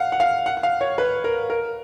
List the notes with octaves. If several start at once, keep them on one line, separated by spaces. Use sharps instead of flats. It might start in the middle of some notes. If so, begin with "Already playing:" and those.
Already playing: F5 F#5
F#5
F5
F#5
F#5
F5
C#5
B4
A#4
A#4